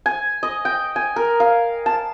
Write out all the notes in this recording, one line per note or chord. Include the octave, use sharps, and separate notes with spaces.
G#5
D#5
G5
G#5
A#4
F5
A5